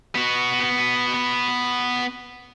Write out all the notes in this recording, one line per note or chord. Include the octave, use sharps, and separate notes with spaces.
B3 F#4